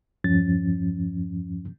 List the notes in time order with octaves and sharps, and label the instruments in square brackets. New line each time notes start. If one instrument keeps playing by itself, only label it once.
[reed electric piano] E2 G2 F3 C#4 A6